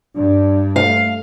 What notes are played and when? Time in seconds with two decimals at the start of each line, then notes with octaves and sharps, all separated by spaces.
0.16 G2 D4
0.76 A3 F5